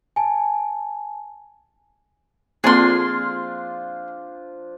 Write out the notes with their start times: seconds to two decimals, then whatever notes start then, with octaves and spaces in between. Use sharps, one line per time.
0.16 G#5 A5
2.64 F3 A#3 C4 D4 F4 G#4 A4 C6